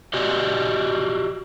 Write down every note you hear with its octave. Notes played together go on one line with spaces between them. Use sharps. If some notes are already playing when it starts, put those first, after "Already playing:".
F#4 G4 D5 D#5